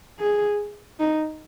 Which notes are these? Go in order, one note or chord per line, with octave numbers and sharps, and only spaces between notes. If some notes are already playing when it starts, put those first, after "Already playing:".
G#4
D#4